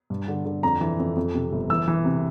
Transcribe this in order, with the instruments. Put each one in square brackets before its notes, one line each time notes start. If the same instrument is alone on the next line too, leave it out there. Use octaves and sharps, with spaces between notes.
[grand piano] G2
D3
D3
F2 A#5
E3
F2
F2
C3
G1
E3 E6
E3
C3